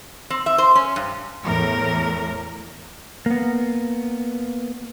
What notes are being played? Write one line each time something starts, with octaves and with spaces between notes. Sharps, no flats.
C4
E5
C5
C#4
G2
E2 A2 A#4
A#3 B3